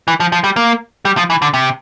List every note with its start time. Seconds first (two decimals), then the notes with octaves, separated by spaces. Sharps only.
0.08 E3
0.20 F3
0.32 F3
0.44 G3
0.56 A#3
1.05 G3
1.17 F3
1.30 E3
1.42 D3
1.54 C3